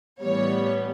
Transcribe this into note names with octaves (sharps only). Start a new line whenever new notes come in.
A2 E3 G3 B3 C#5